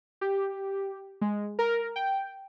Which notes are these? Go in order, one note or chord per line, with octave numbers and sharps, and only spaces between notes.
G4
G#3
A#4
G5